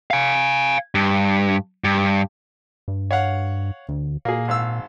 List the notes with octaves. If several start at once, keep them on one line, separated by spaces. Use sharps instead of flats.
F5 G#5
G2
G2
G2
C#5 F5 F#5
D2
A#2 A#3 G#4
G#1 F5 E6